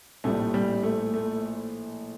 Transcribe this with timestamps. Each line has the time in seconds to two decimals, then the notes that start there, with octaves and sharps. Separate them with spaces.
0.24 A#1 A2 G3 A3
0.54 G3
0.83 A3
1.14 A3